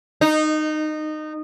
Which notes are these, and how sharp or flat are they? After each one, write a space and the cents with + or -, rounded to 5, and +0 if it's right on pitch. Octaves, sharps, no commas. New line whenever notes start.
D#4 -20